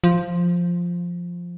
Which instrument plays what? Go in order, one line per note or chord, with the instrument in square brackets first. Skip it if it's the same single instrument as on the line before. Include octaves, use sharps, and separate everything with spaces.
[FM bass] F3